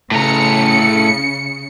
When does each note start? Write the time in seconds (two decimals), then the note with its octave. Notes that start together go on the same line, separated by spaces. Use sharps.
0.11 A2 C#3 A#5 C#7